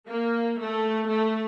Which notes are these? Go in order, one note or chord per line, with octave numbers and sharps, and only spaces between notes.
A#3
A3
A3